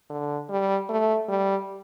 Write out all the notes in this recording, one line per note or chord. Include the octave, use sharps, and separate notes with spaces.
D3
G3
A3
G3